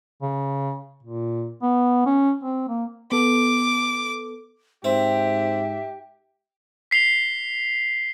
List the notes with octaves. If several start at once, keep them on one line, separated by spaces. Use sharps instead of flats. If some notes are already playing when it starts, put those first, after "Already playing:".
C#3
A#2
B3
C#4
C4
A#3
B3 A4 D6
G#2 C4 G4 E5
B6 C7 F7 G7